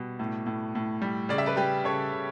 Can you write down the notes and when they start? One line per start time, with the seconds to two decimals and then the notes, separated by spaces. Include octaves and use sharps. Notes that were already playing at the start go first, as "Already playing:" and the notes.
Already playing: B2 G3
0.19 A2
0.46 A2
0.75 A2
1.02 G3
1.29 C#3 D5
1.38 E5
1.46 B4 D5
1.57 G3 G4 B4
1.84 C#3 A4 C#5
2.12 C#3